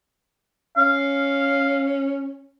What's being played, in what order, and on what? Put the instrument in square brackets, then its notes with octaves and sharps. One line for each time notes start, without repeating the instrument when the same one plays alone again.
[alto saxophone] C#4 [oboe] F5